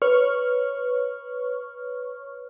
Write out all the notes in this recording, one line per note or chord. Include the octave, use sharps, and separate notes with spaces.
B4 C#5 C#6 F6